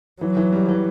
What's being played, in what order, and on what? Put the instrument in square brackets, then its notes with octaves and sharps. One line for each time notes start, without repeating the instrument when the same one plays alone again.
[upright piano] E3 [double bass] F#3
[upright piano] E3
G3
E3